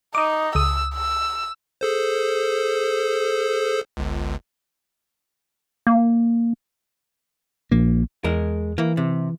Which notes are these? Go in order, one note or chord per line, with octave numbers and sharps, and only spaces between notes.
D#4 D6 D#6
C#2 D#6 E6
E6
G#4 A4 C5
G1 C#2
A#3
A#1 A#3
E2 G#3 A#4
E3 A#3
C3